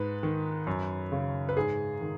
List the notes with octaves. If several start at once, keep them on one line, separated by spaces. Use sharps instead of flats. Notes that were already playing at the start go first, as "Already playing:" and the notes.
Already playing: G#2 B4
D#3
F#2
C#3
B4
G#2 G#4
D#3